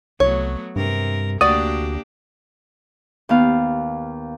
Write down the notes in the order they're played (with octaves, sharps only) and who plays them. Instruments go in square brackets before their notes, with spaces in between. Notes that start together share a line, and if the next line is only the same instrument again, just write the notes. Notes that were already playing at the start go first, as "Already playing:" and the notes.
[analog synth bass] C2 [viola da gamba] F#3 A3 B3 [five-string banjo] C#5
[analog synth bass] G2 [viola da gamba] C3 A#4
[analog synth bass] D2 [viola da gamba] A#3 D4 G4 [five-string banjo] F#4 D5 [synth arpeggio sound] D#6
[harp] D#2 B3 F5